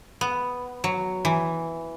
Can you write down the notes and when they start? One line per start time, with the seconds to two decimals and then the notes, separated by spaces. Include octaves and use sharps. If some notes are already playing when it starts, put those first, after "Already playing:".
0.21 B3
0.84 F#3
1.25 E3